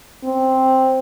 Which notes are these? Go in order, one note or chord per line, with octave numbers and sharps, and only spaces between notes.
C4